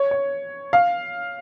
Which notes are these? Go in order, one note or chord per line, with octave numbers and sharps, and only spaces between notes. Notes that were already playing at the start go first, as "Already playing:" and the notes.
Already playing: C#5
C#5
F5